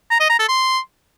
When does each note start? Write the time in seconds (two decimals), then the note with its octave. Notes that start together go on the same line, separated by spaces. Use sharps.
0.11 A#5
0.20 D#5
0.30 A#5
0.39 A4
0.49 C6